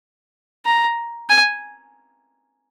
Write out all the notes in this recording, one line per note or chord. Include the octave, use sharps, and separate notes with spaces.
A#5
G#5